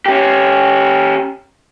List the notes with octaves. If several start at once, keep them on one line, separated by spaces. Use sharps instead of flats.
C#4 G4